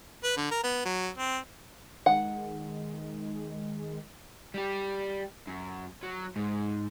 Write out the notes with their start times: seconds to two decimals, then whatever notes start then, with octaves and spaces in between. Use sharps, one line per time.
0.24 B4
0.37 D3
0.51 A#4
0.64 B3
0.85 F#3
1.18 C4
2.06 D#3 G#3 F#5
4.54 G3 G4
5.48 F#2
6.03 F#3
6.36 G#2